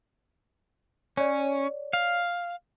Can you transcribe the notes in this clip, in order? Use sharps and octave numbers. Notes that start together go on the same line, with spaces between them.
C#4 C#5 D5
F5